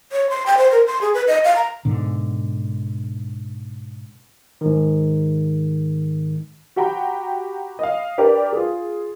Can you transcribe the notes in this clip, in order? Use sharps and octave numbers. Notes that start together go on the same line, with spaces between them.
C#5
C6
G5
C5
A#4
C6
G#4
B4
D#5
F5
A#5
G#2 B2 D3
G#2 D#3
F#4 G4 F#5 G5 A#5 B5
D#5 F5
D4 G4 A#4 B4 D5 G5
F4 G#4